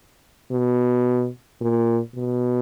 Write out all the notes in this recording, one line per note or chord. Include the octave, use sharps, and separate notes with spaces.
B2
A#2
B2